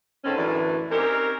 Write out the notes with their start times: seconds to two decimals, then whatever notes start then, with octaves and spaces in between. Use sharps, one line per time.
0.24 G#2 D3 D#3 C4 C#4 A4
0.38 F#2 A2 D3 E3
0.91 C4 C#4 D#4 G4 A#4